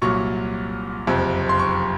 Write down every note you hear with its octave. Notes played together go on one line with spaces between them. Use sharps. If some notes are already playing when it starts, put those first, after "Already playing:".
C2 A#2 F#3 C#6
F#1 F2 C3 F3
C6
C#6